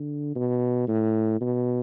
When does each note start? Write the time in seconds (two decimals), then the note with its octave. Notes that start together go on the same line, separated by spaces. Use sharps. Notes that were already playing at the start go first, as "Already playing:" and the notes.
Already playing: D3
0.35 B2
0.88 A2
1.41 B2